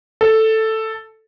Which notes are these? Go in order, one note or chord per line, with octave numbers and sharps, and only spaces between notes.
A4